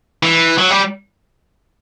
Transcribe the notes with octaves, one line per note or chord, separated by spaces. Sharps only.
E3
F#3
G3